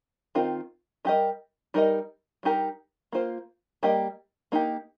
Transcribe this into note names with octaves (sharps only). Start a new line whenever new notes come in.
D#3 C4 F4 A#4 D#5
G3 D#4 G4 A#4 D#5
G3 D#4 A#4 D#5
G3 D#4 G4 A#4
A#3 F4 C5
G3 A#3 G4 D#5
A#3 D#4 G4